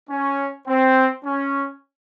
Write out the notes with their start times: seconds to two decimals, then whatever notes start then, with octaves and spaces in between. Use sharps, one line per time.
0.10 C#4
0.67 C4
1.25 C#4